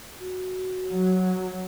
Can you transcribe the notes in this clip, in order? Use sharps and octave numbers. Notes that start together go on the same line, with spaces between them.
F#4
F#3